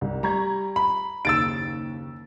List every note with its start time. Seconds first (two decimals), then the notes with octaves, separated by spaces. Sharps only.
0.01 C2
0.23 G3 A#5 C#6 G#6
0.76 B5
1.25 F#1 D#2 E6 A6 D7